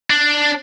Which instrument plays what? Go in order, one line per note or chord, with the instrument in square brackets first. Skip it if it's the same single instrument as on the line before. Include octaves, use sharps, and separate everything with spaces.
[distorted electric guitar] D4